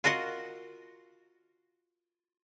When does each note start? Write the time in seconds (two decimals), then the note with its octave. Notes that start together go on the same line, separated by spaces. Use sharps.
0.04 F4 F#4 A#4 D#5 F#5